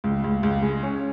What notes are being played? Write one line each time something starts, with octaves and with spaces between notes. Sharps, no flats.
C#2
C#2
C#2
G#3
C#4